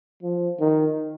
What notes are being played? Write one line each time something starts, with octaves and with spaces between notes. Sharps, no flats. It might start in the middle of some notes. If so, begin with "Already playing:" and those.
F3
D#3